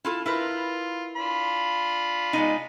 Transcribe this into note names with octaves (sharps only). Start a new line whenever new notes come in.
E4 F4 A4
E4 F4 A#4 B4
D4 F4 B5
G#3 B3 D#4